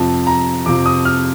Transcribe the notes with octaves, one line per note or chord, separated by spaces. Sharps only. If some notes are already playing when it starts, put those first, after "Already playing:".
Already playing: F2 C3 F3 A5
A#5
F2 C3 F3 D6
D#6
F6